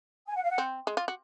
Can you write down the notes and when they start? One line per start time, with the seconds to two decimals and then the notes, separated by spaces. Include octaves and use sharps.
0.27 G#5
0.35 F#5
0.42 F5
0.50 F#5
0.58 C4
0.87 G#3
0.97 F4
1.08 F#4